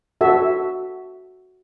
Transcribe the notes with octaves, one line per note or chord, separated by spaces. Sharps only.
F#4 A4 E5